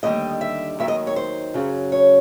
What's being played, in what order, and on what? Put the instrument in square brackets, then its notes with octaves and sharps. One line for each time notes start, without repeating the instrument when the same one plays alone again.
[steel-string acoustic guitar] D#2 D3 G3 D#5
E5
D#2 D#3 F#3 E5
D#5
C#5
C5
F#2 C#3 F#3
C#5